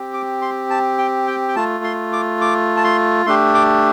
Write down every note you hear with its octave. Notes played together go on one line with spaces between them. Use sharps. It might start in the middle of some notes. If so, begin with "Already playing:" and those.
Already playing: C4 G4
D6
C6
A5
G5
G5
G5
A3 F4 A5
C6
D6
D6
A5
C6
A3 D4 G4 C6
D6